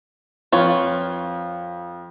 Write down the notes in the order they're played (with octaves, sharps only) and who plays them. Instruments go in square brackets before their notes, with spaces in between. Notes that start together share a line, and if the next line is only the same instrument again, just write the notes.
[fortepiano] F2 [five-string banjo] F4 B4 C#5